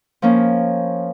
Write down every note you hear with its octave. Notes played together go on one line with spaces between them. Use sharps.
F3 A#3 C#4